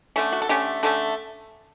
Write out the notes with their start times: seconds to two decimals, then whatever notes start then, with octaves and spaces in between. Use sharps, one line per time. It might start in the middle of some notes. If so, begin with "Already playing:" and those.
0.16 D3 A3 C#4 A4
0.33 F#4
0.42 A4
0.49 D3 A3 C#4 G4
0.83 D3 A3 C#4 A4